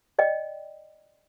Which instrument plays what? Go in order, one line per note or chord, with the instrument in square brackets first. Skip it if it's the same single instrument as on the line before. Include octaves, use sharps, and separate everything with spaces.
[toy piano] D5 D#5 G5